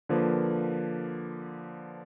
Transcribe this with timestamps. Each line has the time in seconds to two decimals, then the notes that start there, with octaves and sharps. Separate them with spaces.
0.09 D3 F3 A#3 B4